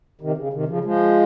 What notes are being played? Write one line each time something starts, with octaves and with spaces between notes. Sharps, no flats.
C3 D#3
C#3
C3 D#3
C#3 F3
F3 G#3